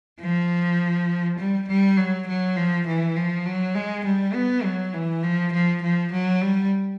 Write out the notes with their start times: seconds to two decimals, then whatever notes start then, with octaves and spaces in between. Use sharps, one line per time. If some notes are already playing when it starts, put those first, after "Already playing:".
0.20 F3
1.38 G3
1.68 G3
1.97 F#3
2.27 F#3
2.56 F3
2.86 E3
3.16 F3
3.45 F#3
3.74 G#3
4.04 G3
4.34 B3
4.64 F#3
4.93 E3
5.23 F3
5.52 F3
5.81 F3
6.12 F#3
6.41 G3